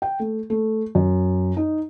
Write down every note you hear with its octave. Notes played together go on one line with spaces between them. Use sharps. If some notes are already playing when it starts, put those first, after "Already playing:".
G5
A3
A3
F#2
D#4